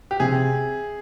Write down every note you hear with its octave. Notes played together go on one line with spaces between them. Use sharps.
G4
C3 G#4